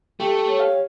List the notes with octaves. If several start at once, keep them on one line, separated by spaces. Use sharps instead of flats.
A3 G4
C#5
F5